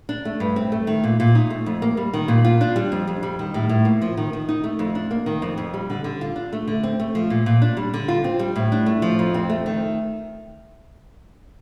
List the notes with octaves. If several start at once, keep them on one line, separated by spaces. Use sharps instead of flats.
D4
A3
G2
C4
A3
D#3
A#2
A#2
D#4
A3
F2
A#3
G3
D#3
A#2
F4
D4
G3
F2
F2
G3
D#3
A2
A2
A#3
F3
D#3
D#3
D#4
A3
F2
D4
A#3
D#3
F2
F2
G3
D3
D3
F4
D4
A3
D3
C4
A3
F3
A#2
A#2
D4
G3
D3
F4
C4
G3
A2
D4
A3
F3
F2
C4
A3
D#3